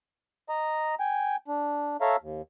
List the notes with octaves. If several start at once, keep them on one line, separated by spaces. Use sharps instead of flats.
D#5 A#5
G5 G#5
D4
A4 C#5 E5 F5 A#5
D#2